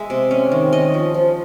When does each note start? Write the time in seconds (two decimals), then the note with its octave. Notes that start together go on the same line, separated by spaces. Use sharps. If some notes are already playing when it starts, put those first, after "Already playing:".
Already playing: G#3 E5
0.10 C3
0.31 C#4
0.52 D#3
0.72 C#4 D#5
0.94 F3
1.14 F3